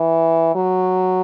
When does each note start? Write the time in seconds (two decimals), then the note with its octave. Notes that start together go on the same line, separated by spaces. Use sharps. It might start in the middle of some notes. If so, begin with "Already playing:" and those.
Already playing: E3
0.55 F#3